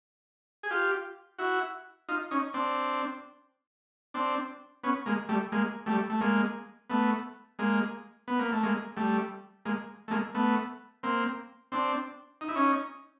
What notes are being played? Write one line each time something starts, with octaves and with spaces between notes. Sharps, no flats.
G#4
F4 G4
E4 F#4
D#4 F4
C#4 D#4
C4 D4
C4 D4
B3 C#4
G#3 A#3
G3 A3
G#3 A#3
G3 A3
A3
G#3 A#3
A3 B3
G#3 A#3
B3
A#3
A3
G#3 A#3
G3 A3
G#3 A#3
A3
G#3 A#3
A3 B3
A#3 C4
C4 D4
D#4
E4
C#4 D#4